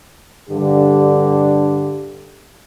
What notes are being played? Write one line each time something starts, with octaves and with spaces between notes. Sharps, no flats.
G2 D3 G4